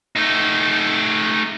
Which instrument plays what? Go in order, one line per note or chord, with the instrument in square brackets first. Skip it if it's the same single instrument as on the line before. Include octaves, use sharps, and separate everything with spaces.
[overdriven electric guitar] A3 D#4